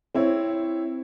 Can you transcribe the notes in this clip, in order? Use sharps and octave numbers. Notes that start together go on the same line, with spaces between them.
C4 E4 C#5